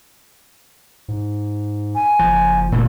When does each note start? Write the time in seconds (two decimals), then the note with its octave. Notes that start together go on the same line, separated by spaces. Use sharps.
1.08 G#2
1.95 G#5
2.19 F#1 F3
2.72 A#2 A3